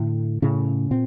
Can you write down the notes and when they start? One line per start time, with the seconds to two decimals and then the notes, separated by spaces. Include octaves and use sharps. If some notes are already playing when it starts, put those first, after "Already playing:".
Already playing: A2 D3
0.42 A2 C#3 C#4
0.91 A#2 C4